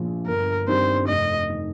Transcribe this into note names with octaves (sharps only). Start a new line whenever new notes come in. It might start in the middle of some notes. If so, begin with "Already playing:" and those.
Already playing: A#1 A#2 F3
G1 A#4
G2 D#3 G3 C4 C5
F1 D#5
D#3